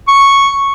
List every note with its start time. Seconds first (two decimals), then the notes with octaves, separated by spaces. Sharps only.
0.08 C#6